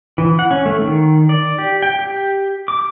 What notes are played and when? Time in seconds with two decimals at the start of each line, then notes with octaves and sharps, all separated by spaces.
0.18 E3
0.39 F#5
0.51 C#4
0.66 A3
0.82 D#3
1.29 D5
1.58 G4
1.82 G5
1.99 G4
2.68 D6